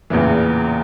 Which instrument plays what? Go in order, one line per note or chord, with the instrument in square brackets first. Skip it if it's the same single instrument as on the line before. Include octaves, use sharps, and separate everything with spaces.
[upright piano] A1 E2 A#2 C#3 E3